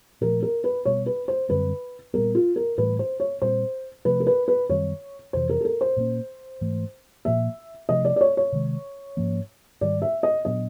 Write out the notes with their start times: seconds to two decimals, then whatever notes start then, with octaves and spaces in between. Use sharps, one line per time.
0.21 A#2 F3 A3 A#4
0.43 A#4
0.64 B4
0.85 B2 G3 B3 C#5
1.06 B4
1.28 C5
1.49 F#2 D3 G3 C4 B4
2.14 A#2 G3 B3 A#4
2.35 F4
2.56 A#4
2.78 A2 E3 G3 B4
2.99 C5
3.20 C#5
3.42 A#2 G3 C4 C5
4.05 C3 F3 A3 B4
4.20 A#4
4.27 B4
4.48 B4
4.69 F#2 D#3 G3 C4 C#5
5.33 F2 C3 E3 C5
5.49 A#4
5.61 A4
5.65 A#4
5.81 C5
5.97 A#2 F3 A#3 C#4
6.61 G#2 E3 A3
7.25 A#2 F3 A#3 E5
7.89 C3 F3 A3 D4 D#5
8.05 D5
8.16 D5
8.21 C#5
8.37 C#5
8.52 C3 D#3 G#3
9.17 G#2 F3 A#3 C#4
9.81 G#2 D#3 G3 D5
10.02 E5
10.23 D#5
10.45 A#2 F#3 B3 D4 D#5